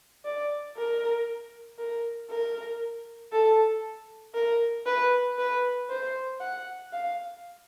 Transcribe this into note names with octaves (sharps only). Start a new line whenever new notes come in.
D5
A#4
A#4
A#4
A4
A#4
B4
B4
C5
F#5
F5